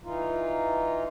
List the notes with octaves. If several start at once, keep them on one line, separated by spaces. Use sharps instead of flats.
E3 D#4 F4